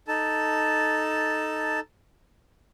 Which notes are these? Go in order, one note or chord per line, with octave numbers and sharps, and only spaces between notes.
D#4 A4 A5